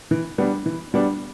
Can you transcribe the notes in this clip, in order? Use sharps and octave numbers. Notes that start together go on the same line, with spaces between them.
E3
G3 B3 D4
E3
G3 B3 D4